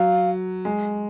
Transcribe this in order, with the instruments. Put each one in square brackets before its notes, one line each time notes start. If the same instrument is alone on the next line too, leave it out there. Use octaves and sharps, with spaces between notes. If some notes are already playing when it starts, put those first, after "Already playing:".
Already playing: [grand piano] F#3 [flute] F5
[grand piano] G#3